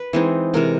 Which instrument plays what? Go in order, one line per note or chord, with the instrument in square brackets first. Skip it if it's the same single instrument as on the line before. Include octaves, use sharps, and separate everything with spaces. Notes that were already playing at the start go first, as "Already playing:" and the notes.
Already playing: [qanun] B4
E3 G#3 C4 D#4
C3 E3 G#3 A#4